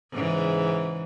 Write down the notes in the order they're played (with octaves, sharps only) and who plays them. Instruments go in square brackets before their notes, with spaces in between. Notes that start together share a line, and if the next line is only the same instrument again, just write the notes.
[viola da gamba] G#2 C#3 E3